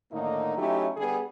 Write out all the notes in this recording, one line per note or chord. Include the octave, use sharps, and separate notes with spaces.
A2 D3 D#3 A#3 D#4
F#3 A3 C#4 D#4 E4 G4
D3 G3 B3 G#4